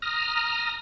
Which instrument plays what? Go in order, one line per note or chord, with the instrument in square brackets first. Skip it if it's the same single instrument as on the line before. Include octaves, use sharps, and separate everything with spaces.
[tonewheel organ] A#5 D#6 F6